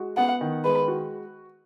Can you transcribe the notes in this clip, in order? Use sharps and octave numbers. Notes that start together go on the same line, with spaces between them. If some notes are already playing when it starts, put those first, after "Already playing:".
Already playing: G#3 F#4
B3 F#5
D#3
G#3 B4
F#4